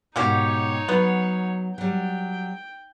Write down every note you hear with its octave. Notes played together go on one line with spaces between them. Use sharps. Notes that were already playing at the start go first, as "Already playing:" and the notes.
G#2 B2 F#3 A#3 D#4 G4 C#5
F#3 B3
F#3 G3 G5